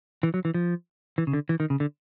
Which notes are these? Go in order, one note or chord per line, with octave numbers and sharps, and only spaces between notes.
E3
F#3
E3
F3
E3
C#3
D3
E3
D#3
C#3
D3